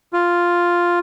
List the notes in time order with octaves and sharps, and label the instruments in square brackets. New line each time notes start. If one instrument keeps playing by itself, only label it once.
[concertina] F4